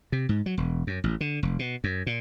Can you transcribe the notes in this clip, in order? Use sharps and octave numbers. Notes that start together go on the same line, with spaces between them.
C3
G#2
F#3
E1
F#2
A1
D3
F1
B2
F#2
A#2